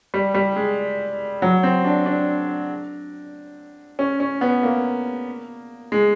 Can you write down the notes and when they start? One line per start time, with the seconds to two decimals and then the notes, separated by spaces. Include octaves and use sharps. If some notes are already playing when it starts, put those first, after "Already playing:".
0.14 G3
0.34 G3
0.56 G#3
1.42 F#3
1.63 C4
1.85 D4
2.06 D4
3.99 C#4
4.20 C#4
4.41 B3
4.63 A#3
5.92 G#3